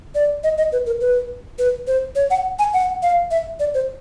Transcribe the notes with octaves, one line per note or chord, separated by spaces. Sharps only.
D5
D#5
D#5
B4
A#4
B4
B4
C5
C#5
F#5
G#5
F#5
F5
E5
D5
C5